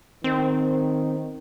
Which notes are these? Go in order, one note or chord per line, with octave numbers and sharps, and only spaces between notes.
D#3 C4